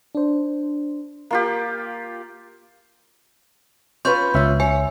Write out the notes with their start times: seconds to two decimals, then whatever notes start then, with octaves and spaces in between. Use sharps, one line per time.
0.15 D4 C5
1.31 A#3 F4 G4
4.05 C#4 F4 B4 C6 C#6 G6
4.34 C#2 C#4 F4 E5
4.60 C#5 G#5